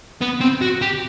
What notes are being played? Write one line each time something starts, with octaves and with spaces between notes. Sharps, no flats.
B3
C4
F#4
G4